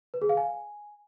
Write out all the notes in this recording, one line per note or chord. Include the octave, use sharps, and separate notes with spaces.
B4
G#4
F5
G#5